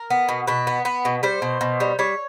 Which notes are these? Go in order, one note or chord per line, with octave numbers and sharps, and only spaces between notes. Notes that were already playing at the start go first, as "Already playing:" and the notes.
Already playing: A#4
B3
B2
B2 B4
B3
B3
B2
G3 C5
B2
B2
G3
G3 C#5